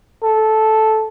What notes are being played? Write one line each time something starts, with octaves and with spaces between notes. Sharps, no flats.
A4